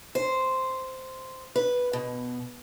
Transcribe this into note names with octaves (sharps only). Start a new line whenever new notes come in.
C5
B4
B2